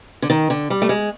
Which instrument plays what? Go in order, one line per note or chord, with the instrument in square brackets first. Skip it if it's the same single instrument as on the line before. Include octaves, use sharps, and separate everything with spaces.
[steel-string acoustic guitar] D3
D#3
D3
G3
A3
G#3